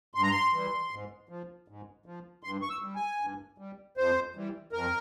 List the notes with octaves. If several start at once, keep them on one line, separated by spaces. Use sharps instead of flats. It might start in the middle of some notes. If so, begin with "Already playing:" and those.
G2 C6
A#5
C6
E3 G3
G#2
F3
G#2
F3
G2 C6
C#6
E6
G3
G#5
G2
G3
F2 C5
E3 G3
F2 A#4